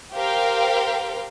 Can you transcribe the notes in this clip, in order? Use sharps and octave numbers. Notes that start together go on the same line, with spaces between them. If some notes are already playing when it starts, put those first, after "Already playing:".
G4 A#4 C5 F5 G5